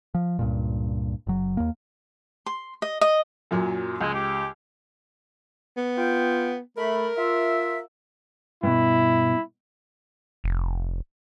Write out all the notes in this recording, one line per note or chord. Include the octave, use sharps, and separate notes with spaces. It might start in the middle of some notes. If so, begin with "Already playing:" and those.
F3
C#2 G2 A#2
F#1 F#3
D#2 A#3
C6
D#5
D#5
F#2 A#2 F#3
C#2 G#3
G4
B3
F4 G5
A3 A#4 B5
F4 E5
G2 B2 E4
F1